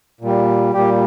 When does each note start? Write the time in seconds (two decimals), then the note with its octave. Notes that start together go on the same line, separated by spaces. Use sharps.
0.21 A#2 G3
0.74 A#2 G3 G4